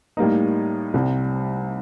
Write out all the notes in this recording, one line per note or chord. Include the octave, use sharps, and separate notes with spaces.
A2 G3 A#3 D#4
C2 C3 G3